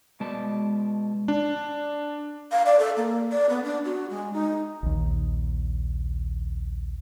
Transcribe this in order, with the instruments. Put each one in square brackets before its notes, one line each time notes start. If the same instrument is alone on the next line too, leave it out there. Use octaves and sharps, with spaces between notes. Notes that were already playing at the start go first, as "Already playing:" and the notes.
[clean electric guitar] B2 G#3 D5 A5
[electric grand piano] D4
[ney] F5
D5
A4
A#3
D5
B3
D4
F#4
G#3
D#4
[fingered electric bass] A#1 D#2